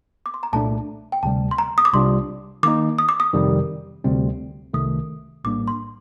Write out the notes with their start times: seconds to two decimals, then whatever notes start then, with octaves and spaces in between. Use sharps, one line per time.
0.26 D6
0.34 C6
0.43 A#5
0.53 C2 A#2 A3 D4 A5
1.12 G5
1.23 D2 C3 G3 A5
1.51 C6
1.58 A#5
1.78 D#6
1.85 D6
1.93 C2 C3 G3 D4 F4 C6
2.63 D#3 A#3 D#4 D6
2.98 D#6
3.09 D6
3.20 D#6
3.33 F2 C3 D#3 G3
4.04 D2 C3 G3 C4
4.73 C2 C3 D#3 A3 D#6
5.44 A#1 A2 G3 A#3 D4 D6
5.68 C6